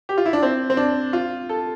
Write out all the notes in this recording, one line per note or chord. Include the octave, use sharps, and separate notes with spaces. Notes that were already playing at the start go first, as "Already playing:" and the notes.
G4
F4
E4
D4
C4
C4
D4
F4
A4